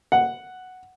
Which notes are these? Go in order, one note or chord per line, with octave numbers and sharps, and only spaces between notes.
F#5